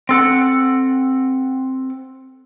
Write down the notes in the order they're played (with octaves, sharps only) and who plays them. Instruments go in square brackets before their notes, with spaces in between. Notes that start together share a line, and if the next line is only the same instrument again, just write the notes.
[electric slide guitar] C4 A4 F#5